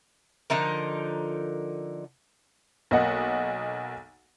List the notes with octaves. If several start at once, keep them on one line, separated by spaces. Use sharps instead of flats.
D3 F3 D#4 A#4
B1 A#3 D#5 F#5